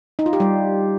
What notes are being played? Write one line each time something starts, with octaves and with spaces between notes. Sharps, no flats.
D#4
F4
G4
G3